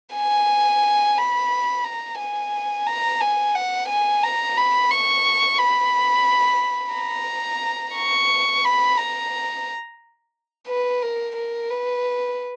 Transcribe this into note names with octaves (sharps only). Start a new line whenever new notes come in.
G#5
B5
A#5
G#5
A#5
G#5
F#5
G#5
A#5
B5
C#6
B5
A#5
C#6
B5
A#5
B4
A#4
A#4
B4